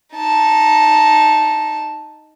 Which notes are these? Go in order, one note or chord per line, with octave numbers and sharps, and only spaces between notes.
D#4 A5